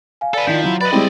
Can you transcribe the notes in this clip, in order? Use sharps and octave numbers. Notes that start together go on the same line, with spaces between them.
F5 G#5
A4 B4 D5
D#3 F3 E4 F4 G6 B6
F#3 E4
B4 D5 D#5 B5
G3 G#3 C4 E4